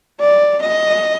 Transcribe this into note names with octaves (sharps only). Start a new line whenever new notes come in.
D5
D#5